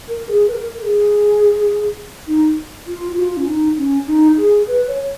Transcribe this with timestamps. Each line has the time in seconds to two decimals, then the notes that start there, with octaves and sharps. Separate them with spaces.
0.08 A#4
0.28 G#4
0.48 B4
0.52 A#4
0.78 A#4
0.82 G#4
2.28 D#4
2.87 F4
3.17 F#4
3.21 F4
3.37 C#4
3.47 D#4
3.77 C#4
4.07 D#4
4.37 G#4
4.67 B4
4.87 C#5